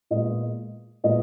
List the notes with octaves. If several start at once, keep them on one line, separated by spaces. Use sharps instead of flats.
A#2 G#3 B3 D#5
A#2 G#3 B3 D#5